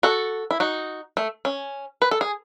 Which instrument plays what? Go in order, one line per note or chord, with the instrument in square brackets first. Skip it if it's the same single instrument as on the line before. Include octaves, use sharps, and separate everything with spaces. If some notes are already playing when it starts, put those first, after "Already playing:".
[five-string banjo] F#4 A4
E4
D#4 F#4
A3
C#4
B4
A4
G#4